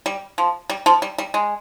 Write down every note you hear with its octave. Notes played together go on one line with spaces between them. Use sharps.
G3
F3
G3
F3
G3
G3
G#3